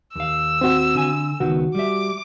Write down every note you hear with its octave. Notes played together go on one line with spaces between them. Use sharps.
D#2 F5 E6
C4 F#4
D3 G#5
C#2 D#3 B3 F#4
G3 E5 D6